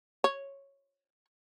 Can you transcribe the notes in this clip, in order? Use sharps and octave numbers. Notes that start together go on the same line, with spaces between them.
C#5